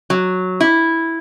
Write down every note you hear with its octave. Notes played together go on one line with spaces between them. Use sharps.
F#3
E4